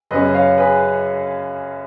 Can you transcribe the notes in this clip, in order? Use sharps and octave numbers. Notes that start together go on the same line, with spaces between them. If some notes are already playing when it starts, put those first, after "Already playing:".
F#2 C#3 F#3 C#4 B4 D#5
C#5 F5
G#4 B4